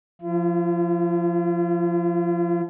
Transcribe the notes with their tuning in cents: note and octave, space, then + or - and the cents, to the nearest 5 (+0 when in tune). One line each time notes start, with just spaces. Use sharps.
F3 +0 F4 -45